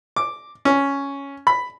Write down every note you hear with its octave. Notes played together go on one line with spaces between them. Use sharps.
D6
C#4
B5